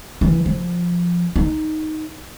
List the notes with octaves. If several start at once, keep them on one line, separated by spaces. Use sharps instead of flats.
E3
F3
D#4